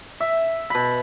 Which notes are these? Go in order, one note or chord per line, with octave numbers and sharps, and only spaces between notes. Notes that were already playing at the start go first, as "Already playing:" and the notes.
E5
B2 B5